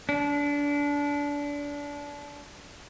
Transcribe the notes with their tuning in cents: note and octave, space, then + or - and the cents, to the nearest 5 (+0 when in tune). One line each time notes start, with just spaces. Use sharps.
D4 -25